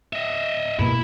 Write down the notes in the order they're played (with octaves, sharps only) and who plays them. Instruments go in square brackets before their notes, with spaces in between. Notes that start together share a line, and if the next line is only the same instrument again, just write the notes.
[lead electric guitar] D#5 E5
[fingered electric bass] G2 B2 A#3 [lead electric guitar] E4